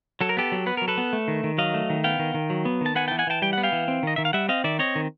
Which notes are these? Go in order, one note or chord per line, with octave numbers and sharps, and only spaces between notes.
F#3 A4
A#4
B3 G4 A4
F#3
B3 B4
F#3 A#4
A4 B4
B3
A3
D#3
D#3
F#3 D#5 F5
A3
D#3
B3 F5 G5
D#3
D#3
F#3
B3
D#3 A5
B3 F#5 G#5
E3 G5 A5
F#5 G#5
E3 G5 A5
G3 G5
B3 F#5
F5 G5
E3
C4
D#3 D#5
D#3 E5
F5
G3 E5 F#5
C4 D#5 F5
D#3 D5 E5
C4 C#5 D#5
D#3